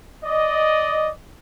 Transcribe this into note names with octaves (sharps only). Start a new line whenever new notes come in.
D5 D#5